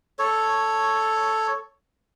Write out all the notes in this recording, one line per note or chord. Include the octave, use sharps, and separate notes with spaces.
A4 C#5